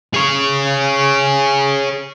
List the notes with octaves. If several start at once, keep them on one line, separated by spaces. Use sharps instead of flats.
G#4 C#5